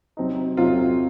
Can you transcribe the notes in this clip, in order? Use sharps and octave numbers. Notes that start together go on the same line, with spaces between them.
C3 F#3 C4 D#4
C3 F#3 C4 D#4 F4